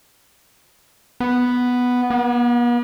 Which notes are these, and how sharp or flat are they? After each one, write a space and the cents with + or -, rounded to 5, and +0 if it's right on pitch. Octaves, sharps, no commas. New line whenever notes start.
B3 +0
B3 -45